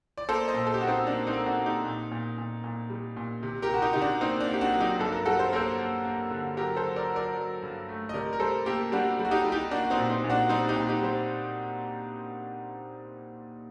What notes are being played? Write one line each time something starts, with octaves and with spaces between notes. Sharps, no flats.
D5
A#3 A4 C5
C5 D#5
A#2
A4
G4
A#3 F#4
C4 D#4
A#3 D4
C4 D#4
A#3
D4 F#4
A#3
D#4 G4
A#2
A#2
A#2
A#2
G3
A#2
C3
G4 A#4
C3 F#4
D#4 G4
C3 D#4
D4 F#4
A#3 C4 D#4
D4
A#3
G4
D4 F#4
F#3
D#4 G4
G2 A4
A#4
G3 F#4 A4
C5
A#4
A#3 A4 C5
A#3
A#3
D3
F#3 G4 A#4
A4 C5
F#3
A#4 D5
F#3
A#4 D5
F#3
G2
A3
D#5
C3 A#4 D5
A#4
G3 A4 C5
A#3 G4 A#4
G3 D4 F#4
G3
F#4
D#4 G4
G3
D#4 G4
A#3 D4 F#4
F#4
C4 D#4
A#2
C4 D#4
A#2
D4 F#4
G3 C4 D#4
D#4 G4
A#2
D#4 G4
G3 C5